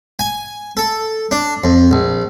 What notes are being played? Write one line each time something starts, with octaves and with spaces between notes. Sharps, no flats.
G#5
A4
D4
F2
A#1